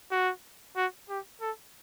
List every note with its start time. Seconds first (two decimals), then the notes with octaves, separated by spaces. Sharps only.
0.11 F#4
0.77 F#4
1.09 G4
1.41 A4